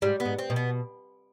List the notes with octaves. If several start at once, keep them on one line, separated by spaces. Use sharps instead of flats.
G#2 G3
B3
G#2
C4
B2
B3